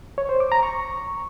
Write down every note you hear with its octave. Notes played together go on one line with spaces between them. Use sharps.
C#5
C5
D6
A#5
C#6